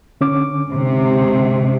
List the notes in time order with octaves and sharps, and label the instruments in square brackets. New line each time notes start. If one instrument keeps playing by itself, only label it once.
[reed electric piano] D3 C#4 D6
[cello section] G#2 C3